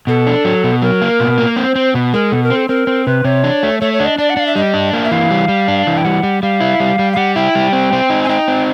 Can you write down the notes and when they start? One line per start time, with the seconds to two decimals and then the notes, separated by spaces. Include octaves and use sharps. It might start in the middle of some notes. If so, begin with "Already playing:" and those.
0.07 B2 A4
0.27 D4
0.45 F#3
0.64 B2
0.82 F#3 A#4
1.02 A#3
1.20 B2
1.38 A#3
1.56 C4 C5
1.76 C4
1.94 B2
2.14 G#3 A#4
2.31 B2 A4
2.43 A#4
2.50 C4
2.56 A4
2.68 C4 A#4
2.87 C4
3.06 C3 B4
3.24 C3 C#5
3.44 D4
3.63 A3
3.80 A3 C#5
3.93 C#5
4.00 D4
4.05 D#5
4.18 D4 D5
4.30 F#5
4.37 D4 F5
4.47 E5
4.56 G3 D#5
4.74 D4
4.93 A#3
5.05 E5
5.11 E3 F5
5.31 G3
5.48 G3
5.68 D4
5.87 E3
5.97 G5
6.05 G3 F#5
6.23 G3
6.42 G3 F5
6.61 E4
6.80 G3
6.99 G3
7.13 F5
7.17 G3 F#5
7.36 E4 G5
7.55 G3
7.73 C4
7.92 C4
8.10 D#4
8.24 G#5
8.29 D#4 G5
8.48 C4